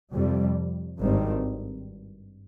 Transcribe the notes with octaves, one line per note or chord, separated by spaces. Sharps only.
F2 C3 G3
G#1 G2 D#3 G3 C4